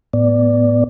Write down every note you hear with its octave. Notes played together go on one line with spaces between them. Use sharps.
A2 B3 D5